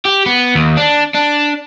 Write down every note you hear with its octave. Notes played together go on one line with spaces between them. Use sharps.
G4
B3
D#2
D4
D4